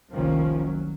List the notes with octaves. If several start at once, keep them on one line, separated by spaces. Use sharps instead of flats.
F1 C2 D#3 F3 A#3 C#4
F#3